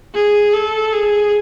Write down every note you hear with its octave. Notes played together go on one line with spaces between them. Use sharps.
G#4
A4
G#4